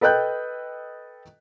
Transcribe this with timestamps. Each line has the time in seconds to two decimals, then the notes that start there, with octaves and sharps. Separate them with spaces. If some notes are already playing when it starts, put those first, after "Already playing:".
0.01 A4 B4 D#5 G5 F#6 G6